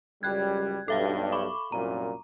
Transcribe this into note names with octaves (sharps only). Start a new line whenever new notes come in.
C#2 F#2 G3 G5 F#6 G#6
B1 G2 A4 E5 F5
B5 C#6 D6
C2 F#2 A#2 A#5